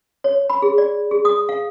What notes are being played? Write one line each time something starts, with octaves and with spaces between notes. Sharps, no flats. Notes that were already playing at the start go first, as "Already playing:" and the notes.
C#5
B5
G#4
D5
G#4
D#6
F5